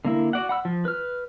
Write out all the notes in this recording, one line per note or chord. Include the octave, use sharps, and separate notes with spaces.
D3 A#3 E4
F#4 D5 F#5
F#5 B5 E6
F3
B4 F6